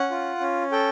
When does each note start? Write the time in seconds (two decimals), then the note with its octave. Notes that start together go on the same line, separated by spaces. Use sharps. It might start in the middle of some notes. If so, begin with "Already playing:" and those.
Already playing: C#4 F#5
0.11 F4
0.40 C#4
0.72 A4 G5